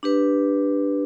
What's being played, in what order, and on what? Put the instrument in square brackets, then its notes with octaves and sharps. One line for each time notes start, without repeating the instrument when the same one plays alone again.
[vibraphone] D4 G4 B4